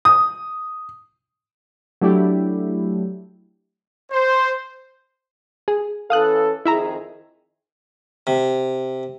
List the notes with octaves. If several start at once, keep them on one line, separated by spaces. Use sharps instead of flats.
D#6
F#3 A3 D4 E4 G4
C5
G#4
E3 C#4 A4 F5 D#6 F#6
F2 D#3 E4 G#4 E5 A#5
C3